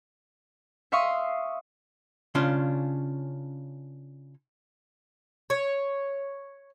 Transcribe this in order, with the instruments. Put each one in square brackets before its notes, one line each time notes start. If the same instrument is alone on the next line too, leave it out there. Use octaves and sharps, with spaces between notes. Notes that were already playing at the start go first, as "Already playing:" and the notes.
[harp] E5 F5 C6 C#6 D#6
[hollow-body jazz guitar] C#3 C#4 D4 F4 C6
[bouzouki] C#5